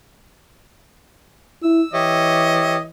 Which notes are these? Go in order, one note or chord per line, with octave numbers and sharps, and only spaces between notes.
E4 E6
E3 G4 C#5 D#5 E5